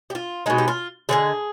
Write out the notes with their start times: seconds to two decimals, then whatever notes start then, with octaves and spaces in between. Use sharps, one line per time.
0.10 G4
0.15 F4
0.46 B2 G#3 D#4
0.58 G4
0.68 F4
1.09 D3 F3 G#3 G#4